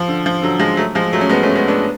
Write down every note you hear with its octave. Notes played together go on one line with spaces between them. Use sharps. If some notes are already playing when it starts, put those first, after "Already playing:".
Already playing: F3
D3
F3
D3 F#3
F3 G#3
F#3 A3
F3 G#3
F#3 A3
C#4
G#3 B3
A3 C#4
G#3 B3
B3 D4